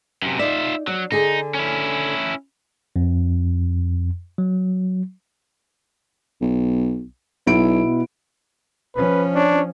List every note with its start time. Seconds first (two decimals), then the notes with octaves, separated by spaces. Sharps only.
0.22 F#2 C3
0.39 D#4 F4 D5 E5
0.87 F#3 D4
1.12 D3 D#4 G#4
1.54 C#4 E4
2.96 F2
4.38 F#3
6.41 B1
7.46 B1 B2 E4 D7
8.96 F3 C#4 B4
9.34 D4 C#5